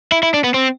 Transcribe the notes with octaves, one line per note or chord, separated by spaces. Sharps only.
E4
E4
D4
B3
C4